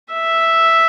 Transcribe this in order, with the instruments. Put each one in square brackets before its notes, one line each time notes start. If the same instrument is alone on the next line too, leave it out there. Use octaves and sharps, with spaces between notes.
[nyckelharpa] E5